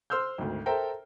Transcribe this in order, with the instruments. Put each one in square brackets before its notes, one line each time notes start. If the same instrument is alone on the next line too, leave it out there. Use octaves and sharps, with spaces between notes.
[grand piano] C5 C6 E6 F6 G6
G#1 D2
A4 A#4 C5 E5 G5 A#5